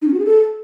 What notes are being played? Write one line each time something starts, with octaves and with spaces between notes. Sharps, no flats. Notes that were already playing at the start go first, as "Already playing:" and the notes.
D#4
C#4
F#4
G#4
A4